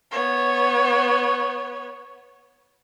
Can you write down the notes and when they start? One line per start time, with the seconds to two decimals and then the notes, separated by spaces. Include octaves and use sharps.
0.11 B3 C#5